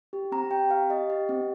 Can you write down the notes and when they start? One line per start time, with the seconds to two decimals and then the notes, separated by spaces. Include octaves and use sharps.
0.13 G4
0.32 C4 A#5
0.51 G4 G5
0.70 G4 F5
0.90 G4 D#5
1.10 G4
1.29 C4